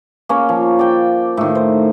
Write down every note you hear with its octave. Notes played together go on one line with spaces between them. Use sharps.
A#3 C#4 C#5
F3
D5 G5
A2 D#3
C5